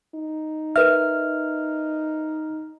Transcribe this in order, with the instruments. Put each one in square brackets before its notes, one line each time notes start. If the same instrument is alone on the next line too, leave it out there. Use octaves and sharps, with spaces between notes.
[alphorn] D#4
[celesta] A#4 B4 E5 [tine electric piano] F6